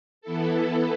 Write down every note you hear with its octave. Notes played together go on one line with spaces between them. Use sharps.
E3 B3 E4 A4